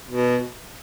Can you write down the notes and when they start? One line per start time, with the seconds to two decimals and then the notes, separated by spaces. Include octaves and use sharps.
0.11 B2